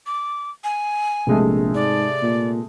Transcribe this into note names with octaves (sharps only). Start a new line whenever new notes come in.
D6
G#5
A#1 C3 G#3 A3
G#2 D5
A#2